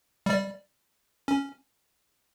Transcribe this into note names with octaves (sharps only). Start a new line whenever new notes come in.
G3 D5
C#4